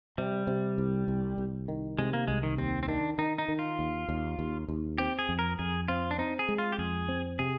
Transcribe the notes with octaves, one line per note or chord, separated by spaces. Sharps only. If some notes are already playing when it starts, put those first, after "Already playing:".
C3 G3
C3
C2
C2
C2
D#3
C3 G#3
A#3
C2 G#3
D#3
D#2 C4
C4
D#3 D4
D#3 D#4
D#4
D#3
F4
D#2
D#2
D#2
D#2
C4 G4
G#4
F2
A#4
F2 G#4
C4 F4
D4
C4 D#4
G#4
G#3
F4
G4
F2 G#4
C4
C3 G#4